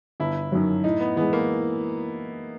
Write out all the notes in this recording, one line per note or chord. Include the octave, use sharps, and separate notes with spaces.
G1 E4
F#2 D#3 F#3
A2 D#4
B3
E3 G#3 B3
A#3